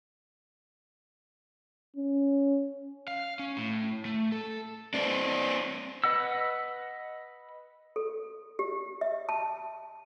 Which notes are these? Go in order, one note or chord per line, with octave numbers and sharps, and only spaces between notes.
C#4
F5
C#4
A2
A3
A4
C4 D4
B4 D#5 F#5 E6
A4
G4
E5
A5